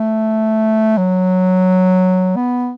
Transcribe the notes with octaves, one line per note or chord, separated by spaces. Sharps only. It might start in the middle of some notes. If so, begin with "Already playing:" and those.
Already playing: A3
F#3
B3